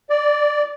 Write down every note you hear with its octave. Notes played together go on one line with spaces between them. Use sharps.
D5